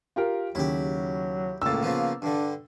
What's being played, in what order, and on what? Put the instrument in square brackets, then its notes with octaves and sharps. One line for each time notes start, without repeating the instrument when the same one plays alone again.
[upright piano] F4 G4 A#4
[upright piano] D#2 C#3 [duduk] F#3 [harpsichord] E4 G4
[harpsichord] C#2 A2 [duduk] A#3 [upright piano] E6 A6
[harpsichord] C#3 F3 B3
[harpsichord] G2 D3 [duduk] D4